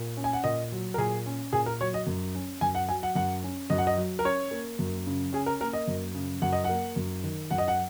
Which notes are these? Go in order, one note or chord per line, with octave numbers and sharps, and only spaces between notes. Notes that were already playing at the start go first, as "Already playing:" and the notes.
Already playing: A#2
C#4
G#5
F#5
A#2 D#5
F#3
A#4
A#2 G#4
C#4
A#2 G#4
A#4
F#3 C#5
D#5
F#2
C#4
F#2 G#5
F#5
F#3 G#5
F#5
F#2 F#5
C#4
F#2 D#5
F#5
D#5
F#3
A#4
C#4 C#5
A#3
F#2
C#3
C#4 G#4
A#4
A#3 A#4
D#5
F#2
C#3
F#2 F#5
D#5
A#3 F#5
F#2
D#3
F#2 F#5
D#5
F#5